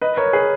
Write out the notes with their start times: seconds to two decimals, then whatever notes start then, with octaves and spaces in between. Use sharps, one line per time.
0.01 B4 D#5
0.17 A#4 C#5
0.33 G#4 B4